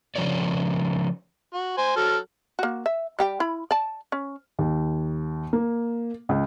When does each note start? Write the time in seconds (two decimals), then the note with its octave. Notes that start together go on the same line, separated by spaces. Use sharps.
0.16 C#3 F3 A#4 C#5 D5
1.54 F#4
1.78 C5 G#5
1.96 F#3 A4 F6
2.59 A#3 F#4
2.86 E5
3.19 G3 G4 G5
3.40 E4 B5
3.71 D5 A5
4.12 C#4
4.59 D#2
5.53 A#3
6.29 C#2